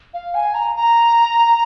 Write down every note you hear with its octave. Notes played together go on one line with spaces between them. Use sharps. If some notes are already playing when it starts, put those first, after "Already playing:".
F5
G#5
A#5
A#5